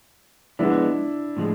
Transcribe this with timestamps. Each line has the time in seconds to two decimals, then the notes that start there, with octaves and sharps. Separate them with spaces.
0.59 F3 G#3 B3 D4 E4
1.37 A2 F3 G#3